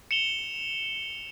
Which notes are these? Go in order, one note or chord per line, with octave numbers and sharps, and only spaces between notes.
C#7 E7 F7 G7